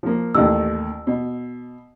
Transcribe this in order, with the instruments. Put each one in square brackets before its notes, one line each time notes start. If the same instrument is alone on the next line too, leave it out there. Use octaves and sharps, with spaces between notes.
[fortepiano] F3 A#3
[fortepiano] A1 D#2 [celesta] E6
[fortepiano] B2